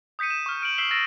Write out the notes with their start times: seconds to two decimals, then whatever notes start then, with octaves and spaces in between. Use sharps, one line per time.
0.19 D#6 G6 B6 C#7 D#7
0.30 E7
0.46 C#6 F6
0.62 F6 D7 D#7 F#7
0.78 E6 B6 C7 E7 F#7 G7
0.91 E6 A6 A#6 D7 E7 F#7